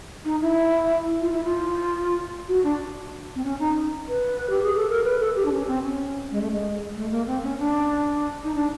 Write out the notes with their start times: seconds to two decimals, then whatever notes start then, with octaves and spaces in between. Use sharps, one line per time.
0.25 D#4
0.41 E4
1.21 F4
1.32 E4
1.44 F4
2.48 F#4
2.64 D4
3.35 C4
3.44 C#4
3.60 D#4
4.08 B4
4.50 G4
4.63 G#4
4.76 A4
4.90 A#4
5.04 B4
5.19 A4
5.36 G4
5.45 D4
5.52 C#4
5.68 C4
5.84 C#4
6.31 G#3
6.41 A3
6.52 G#3
6.95 A3
7.11 A#3
7.27 C4
7.43 C#4
7.59 D4
8.44 D#4
8.55 D4